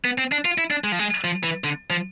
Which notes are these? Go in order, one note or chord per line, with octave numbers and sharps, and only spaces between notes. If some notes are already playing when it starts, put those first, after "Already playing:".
B3
C4
D4
F4
E4
D4
G#3
F3
G#3
F3
E3
D3
F3